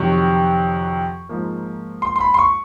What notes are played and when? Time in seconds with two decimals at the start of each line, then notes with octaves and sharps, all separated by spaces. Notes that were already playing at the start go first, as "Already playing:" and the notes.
Already playing: F2 C3 D#3 F#3 C#6
1.29 G#2 F3 A#3
2.02 C6
2.16 C6
2.21 B5
2.34 C6
2.39 C#6